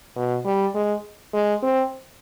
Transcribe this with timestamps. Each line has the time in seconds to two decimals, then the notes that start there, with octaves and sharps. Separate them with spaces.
0.17 B2
0.45 G3
0.75 G#3
1.34 G#3
1.63 C4